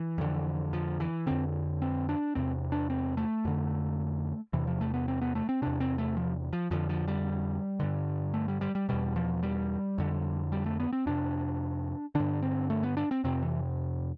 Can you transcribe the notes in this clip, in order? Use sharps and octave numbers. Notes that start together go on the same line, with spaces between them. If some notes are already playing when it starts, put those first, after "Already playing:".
Already playing: E3
F2 D3
F3
E3
F2 D3 C4
C4
D4
E2 C3 C4
D4
C4
A3
F2 D3
E2 C3 E3
F3
A3
B3
C4
B3
A3
C4
E2 C3 D4
C4
A3
F3
F3
F2 D3 F3
F3
G3
G2 D3
A3
G3
G3
G3
E2 B2 G3
F3
G3
F2 D3
G3
A3
B3
C4
F2 C3 D4
G2 D3 D4
C4
A3
B3
D4
C4
F2 C3 C4
E3